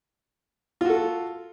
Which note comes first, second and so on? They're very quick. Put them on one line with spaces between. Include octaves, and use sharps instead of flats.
F4 F#4 A4